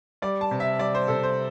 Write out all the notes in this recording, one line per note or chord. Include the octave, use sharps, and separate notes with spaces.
G3 D5
A5
C3
E5
G3 D5
C5
C3 A4
C5